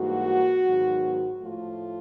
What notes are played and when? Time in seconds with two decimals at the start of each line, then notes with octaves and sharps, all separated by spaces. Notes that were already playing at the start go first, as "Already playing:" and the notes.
Already playing: G#2 E3 G3 A#3 F#4
0.66 G#2 D#3 F#3 B3
1.42 A2 F3 A3 F4